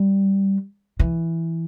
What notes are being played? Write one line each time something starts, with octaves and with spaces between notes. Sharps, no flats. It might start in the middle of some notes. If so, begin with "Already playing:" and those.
Already playing: G3
E3